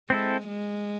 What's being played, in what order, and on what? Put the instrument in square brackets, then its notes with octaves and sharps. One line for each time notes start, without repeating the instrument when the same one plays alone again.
[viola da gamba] G#3 [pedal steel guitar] C4 E4 A4
[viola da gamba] G#3